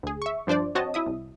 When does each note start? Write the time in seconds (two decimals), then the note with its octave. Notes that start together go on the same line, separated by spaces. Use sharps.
0.03 D2 G#4
0.22 E5 C#6
0.47 G2 F3 D4 C5 D5
0.75 C4 F#4 C#5 D#5 A5
0.94 E4 E5 D#6
1.06 C2